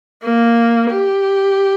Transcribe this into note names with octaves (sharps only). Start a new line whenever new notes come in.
A#3
G4